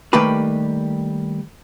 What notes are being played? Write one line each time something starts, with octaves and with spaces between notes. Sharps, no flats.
D#3 G3 A3 A#3 G4 B4